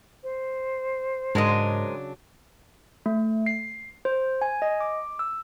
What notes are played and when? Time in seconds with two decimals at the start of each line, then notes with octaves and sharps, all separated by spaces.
0.23 C5
1.35 G#2 C#3 F#3 G#3 D4 A#4 D#5
3.06 A3
3.46 C7
4.05 C5
4.42 G#5
4.62 D#5
4.81 D6
5.19 E6